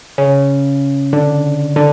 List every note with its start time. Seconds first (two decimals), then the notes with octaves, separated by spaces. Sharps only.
0.18 C#3 C#4
1.13 D3 D4
1.76 D3 D4